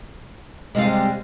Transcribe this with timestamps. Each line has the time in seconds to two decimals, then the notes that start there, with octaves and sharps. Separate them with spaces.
0.75 C3 G3 G#3 F5